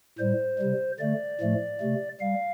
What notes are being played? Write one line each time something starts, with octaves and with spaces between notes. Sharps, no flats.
A2 G3 C5
C3 G3
D3 A3 D5
A2 F3 A3
C3 A3
G3 F5